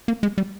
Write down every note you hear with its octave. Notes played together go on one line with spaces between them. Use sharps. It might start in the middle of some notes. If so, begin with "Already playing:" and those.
A#3
G#3
G3